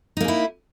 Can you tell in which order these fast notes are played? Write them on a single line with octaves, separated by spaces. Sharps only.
D#4 A#3 G#4 E4